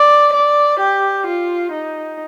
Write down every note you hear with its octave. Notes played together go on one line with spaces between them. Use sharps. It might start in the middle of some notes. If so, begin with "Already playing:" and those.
Already playing: D5
D5
G4
F4
D#4